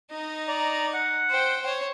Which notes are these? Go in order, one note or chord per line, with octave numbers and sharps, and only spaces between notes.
D#4 D#5
D5 A#5
F#5
C5 G5
C5 C#5